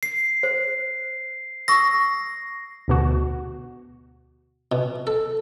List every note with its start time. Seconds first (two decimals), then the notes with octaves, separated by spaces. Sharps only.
0.03 C7
0.43 C5
1.68 C#6 D#6 E6 A#6
2.88 D2 B2 F#4
4.72 B2
5.07 A4